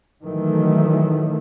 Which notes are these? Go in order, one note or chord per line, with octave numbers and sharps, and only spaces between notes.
D#3 E3 F#3 A3